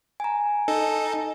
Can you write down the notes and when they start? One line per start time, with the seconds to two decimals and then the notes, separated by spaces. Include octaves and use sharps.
0.20 G#5 A#5
0.68 D#4 A4